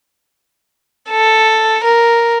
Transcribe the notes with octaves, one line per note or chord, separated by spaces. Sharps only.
A4
A#4